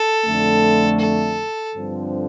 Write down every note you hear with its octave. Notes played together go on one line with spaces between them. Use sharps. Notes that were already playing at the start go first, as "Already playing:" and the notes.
Already playing: A4
F2 D3 A3
A4
G2 D3 F3 C4